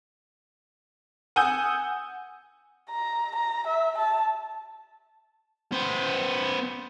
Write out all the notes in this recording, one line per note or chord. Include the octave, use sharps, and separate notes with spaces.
F#5 G#5 D#6 E6 G6
A#5
A#5
E5
A5
B3 C5